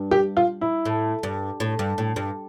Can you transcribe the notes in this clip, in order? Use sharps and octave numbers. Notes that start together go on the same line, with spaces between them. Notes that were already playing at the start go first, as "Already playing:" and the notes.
Already playing: G2
G4
F4
E4
A2
G2
A2
G2
A2
G2